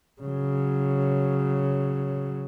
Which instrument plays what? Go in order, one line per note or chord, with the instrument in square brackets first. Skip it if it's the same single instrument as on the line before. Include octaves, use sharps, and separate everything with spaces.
[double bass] C#3 F#3